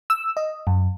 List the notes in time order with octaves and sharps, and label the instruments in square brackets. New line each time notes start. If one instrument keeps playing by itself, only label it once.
[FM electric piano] E6
D#5
F#2